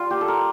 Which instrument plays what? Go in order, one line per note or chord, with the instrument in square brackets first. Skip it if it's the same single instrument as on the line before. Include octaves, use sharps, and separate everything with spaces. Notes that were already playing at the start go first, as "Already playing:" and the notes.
Already playing: [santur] G3 F4
A#3 G4
A4
A#4